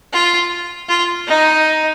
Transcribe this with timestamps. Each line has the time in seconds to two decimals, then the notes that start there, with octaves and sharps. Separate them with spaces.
0.13 F4
0.89 F4
1.27 D#4